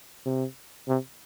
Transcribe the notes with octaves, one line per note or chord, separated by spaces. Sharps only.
C3
C3